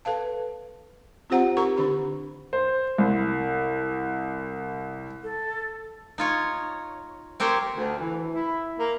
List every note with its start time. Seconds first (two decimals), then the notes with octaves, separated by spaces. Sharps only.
0.05 A4 B4 F5 A5
1.30 C4 F4 G4 C5 F#5 A#5
1.57 D#4 G4 A#4 A#5 C#6
1.77 D3 D4 G4 B5
2.53 C5
2.98 C2
5.23 A4
6.18 D#4 F4 C#5
7.40 C4 G4 A#4 C5 C#5
7.75 D2
7.98 E3
8.32 E4
8.78 A#3